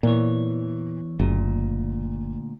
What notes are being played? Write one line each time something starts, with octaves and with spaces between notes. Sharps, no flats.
E2 A#2 E3 C#5
F#1 D2 A#2